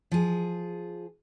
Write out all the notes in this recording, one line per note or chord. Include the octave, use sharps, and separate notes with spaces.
F3 G#4